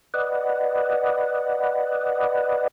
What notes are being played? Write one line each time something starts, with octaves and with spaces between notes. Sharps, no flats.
B4 D5 D#5 F#5